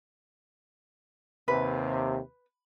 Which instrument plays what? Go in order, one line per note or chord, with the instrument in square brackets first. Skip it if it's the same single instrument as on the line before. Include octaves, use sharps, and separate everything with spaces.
[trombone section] D#2 C3 [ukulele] B4